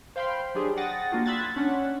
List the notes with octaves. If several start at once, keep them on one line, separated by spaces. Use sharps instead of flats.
C5 F5 G5 B5 C6
F#3 D4 G4 G#4
F#5 G5 D#6 A6 A#6
A#3 D4 F4 F#4
B5 C6 E6 F#6 G#6 A6
C#4 D4 F#5